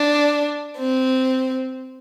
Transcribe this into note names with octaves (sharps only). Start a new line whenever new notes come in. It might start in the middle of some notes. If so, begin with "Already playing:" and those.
Already playing: D4
C4